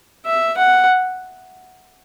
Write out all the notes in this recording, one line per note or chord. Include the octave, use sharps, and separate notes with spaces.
E5
F#5